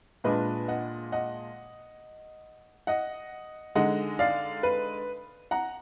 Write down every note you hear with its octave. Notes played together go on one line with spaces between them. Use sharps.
A#2 G#3 D4 B4 D#5
D#5 F#5
D#5 F#5
D#5 F#5
D3 G#3 D#4 D#5 F#5
D5 F5
B4
F#5 A#5